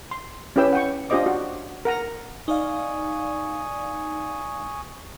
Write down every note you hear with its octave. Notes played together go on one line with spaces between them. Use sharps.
C6
C#4 E4 G4 B4 G5 E6
F#5 G5 C#6
D4 F4 G4 C5 D#5 D6
F#4
A#4 F#5 A#5
D#4 D5 F5 G#5 C#6 D#6